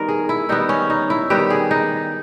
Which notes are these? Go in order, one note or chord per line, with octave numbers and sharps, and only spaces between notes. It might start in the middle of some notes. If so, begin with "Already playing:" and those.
Already playing: D#3 G3 B3 A#4
G#4
E4
D#3 G3 B3 D#4
C#4
D#4
E4
D#3 G3 B3 G4
G#4
D#4